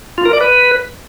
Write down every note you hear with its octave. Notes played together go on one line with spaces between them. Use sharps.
F4
A#4
D5
B4